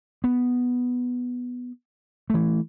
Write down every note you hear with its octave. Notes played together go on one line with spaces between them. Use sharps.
B3
E3 A3